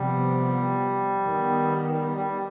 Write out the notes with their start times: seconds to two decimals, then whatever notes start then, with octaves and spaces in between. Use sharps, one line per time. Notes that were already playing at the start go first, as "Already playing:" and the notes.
Already playing: C3 F3 G3 B3
1.25 D#3 B3
1.94 G3
2.17 G3